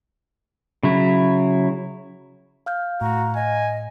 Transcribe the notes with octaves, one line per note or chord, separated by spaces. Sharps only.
C#3 F#3 E4
F5 F6 G6
A2 F#4 A#5
D#5 G#5